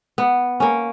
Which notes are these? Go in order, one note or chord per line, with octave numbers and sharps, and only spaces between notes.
B3
A#3 C#4